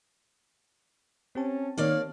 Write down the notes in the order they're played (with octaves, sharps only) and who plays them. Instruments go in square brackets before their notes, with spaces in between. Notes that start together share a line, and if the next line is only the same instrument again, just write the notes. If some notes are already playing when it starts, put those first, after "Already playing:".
[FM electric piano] C4 G4 A5 [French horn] C#4
[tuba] D#3 [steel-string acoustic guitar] A#3 D5 F5 [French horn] C#5